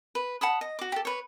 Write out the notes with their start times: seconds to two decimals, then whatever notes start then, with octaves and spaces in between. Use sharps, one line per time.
0.15 B4
0.41 F#5 A5 B5 D#6
0.61 D#5
0.79 F#4 D6
0.92 G4 A4
1.05 B4 C#5